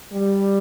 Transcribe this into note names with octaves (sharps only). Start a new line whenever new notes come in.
G3